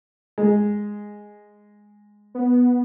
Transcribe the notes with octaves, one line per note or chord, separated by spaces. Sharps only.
G#3
B3